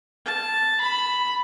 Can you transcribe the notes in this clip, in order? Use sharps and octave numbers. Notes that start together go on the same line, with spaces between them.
A5
B5